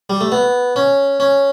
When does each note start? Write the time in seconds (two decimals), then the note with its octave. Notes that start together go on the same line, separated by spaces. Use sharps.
0.10 G3
0.21 A3
0.32 B3
0.76 C#4
1.20 C#4